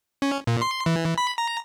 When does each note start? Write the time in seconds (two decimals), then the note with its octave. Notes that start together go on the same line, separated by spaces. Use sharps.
0.22 C#4
0.47 A#2
0.62 C6
0.86 E3
1.18 B5
1.38 A#5